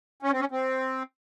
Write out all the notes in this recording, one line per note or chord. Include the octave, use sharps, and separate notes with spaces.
C#4
C4
C#4
C4